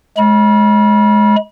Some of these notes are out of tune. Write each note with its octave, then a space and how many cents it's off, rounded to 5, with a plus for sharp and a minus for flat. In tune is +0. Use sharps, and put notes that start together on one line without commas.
G#3 +25 B5 -35